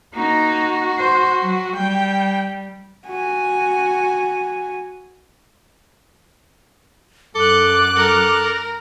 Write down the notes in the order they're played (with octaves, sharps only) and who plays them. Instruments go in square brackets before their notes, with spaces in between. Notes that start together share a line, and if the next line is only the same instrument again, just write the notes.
[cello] A#3 D#4 [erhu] F#4
[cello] C5
F#3
[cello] G3 [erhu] G5
[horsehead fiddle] F#4 G#5
[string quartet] F#2 F#6 [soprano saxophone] A4 [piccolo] D6
[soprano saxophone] A4 [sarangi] A#4